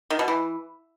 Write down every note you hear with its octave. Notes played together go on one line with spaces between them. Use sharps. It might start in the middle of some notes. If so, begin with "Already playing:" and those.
D#3
B2
E3